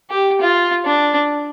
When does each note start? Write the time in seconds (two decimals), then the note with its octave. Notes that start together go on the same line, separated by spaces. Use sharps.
0.10 G4
0.41 F4
0.85 D4